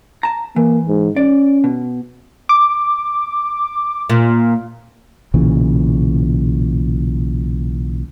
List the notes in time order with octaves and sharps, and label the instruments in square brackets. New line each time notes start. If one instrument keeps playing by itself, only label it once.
[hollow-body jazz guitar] A5 A#5
[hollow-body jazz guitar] E3 [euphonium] A#3
[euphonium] G#2
[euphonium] C#4 [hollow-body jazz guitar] D5
[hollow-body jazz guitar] B2
[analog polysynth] D6
[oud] A#2
[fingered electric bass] B1 A#2 C#3 E3